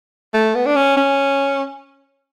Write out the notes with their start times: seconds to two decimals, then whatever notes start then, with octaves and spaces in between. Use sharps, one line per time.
0.34 A3
0.55 B3
0.66 D4
0.76 C#4
0.97 C#4